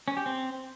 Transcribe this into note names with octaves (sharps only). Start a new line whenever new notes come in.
C#4
G4
C4